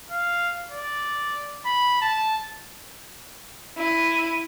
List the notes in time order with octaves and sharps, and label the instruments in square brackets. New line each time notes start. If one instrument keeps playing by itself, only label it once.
[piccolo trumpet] F5
D5
B5
A5
[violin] E4 D#7